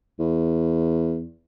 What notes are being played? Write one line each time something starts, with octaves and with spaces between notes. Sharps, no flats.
E2